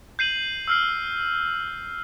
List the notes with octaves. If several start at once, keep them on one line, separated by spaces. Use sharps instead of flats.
G6 C7 D#7 F#7
E6 F6 C7